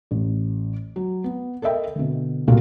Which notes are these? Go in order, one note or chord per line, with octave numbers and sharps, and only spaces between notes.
A1
F#3
B3
A4 A#4 D#5 E5 G5
B2 D3
D#1 C2 A#2 F#4 A4 F5